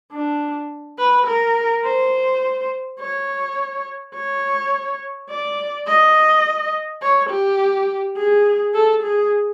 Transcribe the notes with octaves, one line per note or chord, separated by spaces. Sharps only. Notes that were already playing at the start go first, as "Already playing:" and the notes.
D4
B4
A#4
C5
C#5
C#5
D5
D#5
C#5
G4
G#4
A4
G#4